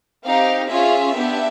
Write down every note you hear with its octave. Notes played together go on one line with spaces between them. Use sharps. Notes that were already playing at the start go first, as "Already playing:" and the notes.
C4 D#4 G4 F5
C#4 F4 G#4 E5
B3 D4 G4